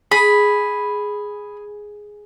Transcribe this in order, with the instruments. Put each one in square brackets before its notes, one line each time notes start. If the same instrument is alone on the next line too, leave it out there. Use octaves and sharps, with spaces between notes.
[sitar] G#4 [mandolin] B5